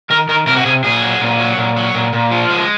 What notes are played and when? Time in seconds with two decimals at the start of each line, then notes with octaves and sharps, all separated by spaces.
0.10 D#3 A#4
0.29 D#3 A#4
0.47 C3 A#4
0.56 F#4
0.65 C3 G#4
0.84 A#2 G#4
1.02 F#3
1.21 A#2
1.39 F#3
1.57 A#2
1.77 F#3
1.94 A#2
2.13 A#2
2.31 F3
2.50 G#3